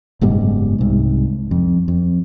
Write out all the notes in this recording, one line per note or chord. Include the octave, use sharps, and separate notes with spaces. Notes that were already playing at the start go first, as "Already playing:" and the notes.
F#1 G#2 B2 G3
C2 G#2
F2
F2